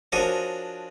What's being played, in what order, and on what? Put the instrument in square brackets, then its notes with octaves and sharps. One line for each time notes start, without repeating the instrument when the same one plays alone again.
[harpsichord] F3 D4 F#4 G#4 A#4 C#5